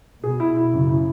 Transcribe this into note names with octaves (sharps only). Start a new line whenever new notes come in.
B2 G#4
E4
E4
F#2 C#3
E4